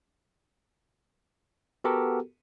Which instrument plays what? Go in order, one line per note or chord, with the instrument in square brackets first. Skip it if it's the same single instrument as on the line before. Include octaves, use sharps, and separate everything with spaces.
[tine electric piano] B3 F#4 G4 A4 A#4